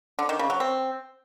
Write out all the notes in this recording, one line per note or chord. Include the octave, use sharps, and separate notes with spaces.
D3
D#3
C#3
F#3
C4